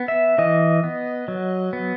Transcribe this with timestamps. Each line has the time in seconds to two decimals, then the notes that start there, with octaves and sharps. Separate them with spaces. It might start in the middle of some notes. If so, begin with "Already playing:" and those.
Already playing: B3
0.08 E5
0.38 E3 D#5
0.84 B3
1.28 F#3
1.73 B3